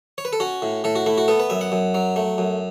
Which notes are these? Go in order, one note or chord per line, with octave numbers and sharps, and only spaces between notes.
C#5
B4
A4
C#4 F#4
A2
A2 A4
F#4
A3 E4
F#4
B3 A4
B4
F#2 E5
F#5
F#2
F#3
A3
F#2